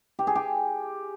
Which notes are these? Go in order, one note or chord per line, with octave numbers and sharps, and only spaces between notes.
G4
G#4
G4